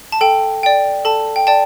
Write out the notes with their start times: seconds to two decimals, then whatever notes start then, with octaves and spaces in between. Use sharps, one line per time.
0.12 A5
0.21 A4 G5
0.63 D5 G5
1.05 A4 A5
1.36 G5
1.47 D5 G5 A5